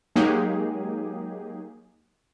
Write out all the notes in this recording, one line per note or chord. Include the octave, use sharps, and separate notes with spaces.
F#3 G#3 A#3 D#4 G4 G#4